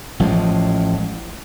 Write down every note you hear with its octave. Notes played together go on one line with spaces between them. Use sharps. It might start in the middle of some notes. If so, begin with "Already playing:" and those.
A1 F3 F#3 G#3